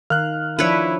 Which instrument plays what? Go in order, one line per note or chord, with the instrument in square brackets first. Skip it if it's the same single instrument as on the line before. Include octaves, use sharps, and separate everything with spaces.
[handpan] D#3 A#4 F5 [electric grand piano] F6 F#6
[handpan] F3 D4 [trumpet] E4 [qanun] B4 C#5